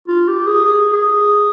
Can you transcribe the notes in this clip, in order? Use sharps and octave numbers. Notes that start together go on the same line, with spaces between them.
F4
G4
G#4
G#4
G#4